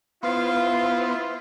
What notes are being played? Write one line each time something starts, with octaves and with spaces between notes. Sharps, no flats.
B3 E4 F4 C5 F5